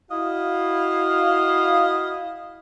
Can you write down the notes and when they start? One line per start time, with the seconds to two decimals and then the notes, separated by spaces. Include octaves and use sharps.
0.11 E4 F#4 D#5 F5